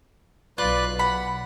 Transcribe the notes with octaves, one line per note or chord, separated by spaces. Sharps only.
B1 F4 B4 D5 F#6
F#5 B5